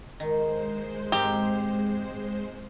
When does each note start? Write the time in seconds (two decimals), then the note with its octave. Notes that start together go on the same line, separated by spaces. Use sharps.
0.20 D#3 G#3 C5
1.12 G#2 C4 G4 A#5